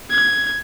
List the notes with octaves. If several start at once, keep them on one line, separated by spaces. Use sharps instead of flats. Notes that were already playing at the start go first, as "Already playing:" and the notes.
G#6